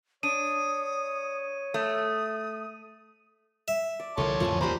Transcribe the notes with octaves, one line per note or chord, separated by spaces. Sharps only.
D4 C#5 D#6 D#7
A3 D#6
E5
D5
C2 D3 F3 A4 A#4 C#5 A5 C6
F2 A2 D3 F3 F4 G#5
A1 D#2 F3 G3 C5 A#5 B5 D6